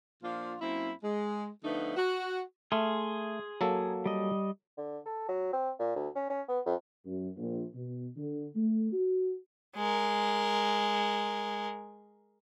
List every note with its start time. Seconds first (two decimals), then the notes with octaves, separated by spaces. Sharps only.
0.23 A#2 F3 D4 F4
0.61 F#2 A#3 C4 E4
1.04 G#3
1.64 D3 F3 A3 B3 D4 D#4
1.97 F#4
2.72 A3 G#4 C6 F6
3.61 F#3 A#3 A4
4.06 G3 D#5
4.77 D3
5.06 A4
5.28 F#3
5.53 C4
5.79 A#2
5.96 D2
6.15 C#4
6.30 C#4
6.48 B3
6.66 F2
7.05 F#2
7.36 A#1
7.74 B2
8.16 D3
8.56 A3
8.93 F#4
9.76 G#3 A#4